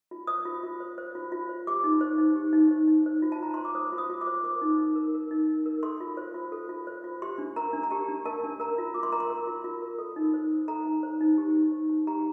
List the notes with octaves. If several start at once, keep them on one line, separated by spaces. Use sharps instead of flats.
F4
C5 D#6
F4
F4
C5
C5
F4
F4
C5
G4 D6
D#4
C5
D#4
G4
D#4
C5
D#4
C5
F4
A5
F4 A#5
C5 C6
D6
C5 D#6
F4
D#6
F4
D6
C5
A#4 D6
D#4
D#4
A#4
A#4
D#4
D#4
A#4
A4 C6
F4
C5
F4
A4
F4
C5
F4
G4 C6
D4
A#4 A#5
D4
A#5
G4 A5
D4
A#4 A5
D4
A#4 A#5
F4
F4 D6
C6
A#4 A#5
C6
A#4
F4
F4
A#4
A4
D#4
C5
D#4
A4 A#5
D#4
C5
D#4
G4
D#4
C5
D#4
G4 A#5